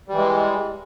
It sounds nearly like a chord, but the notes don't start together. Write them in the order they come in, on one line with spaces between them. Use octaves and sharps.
G3 E3 G#3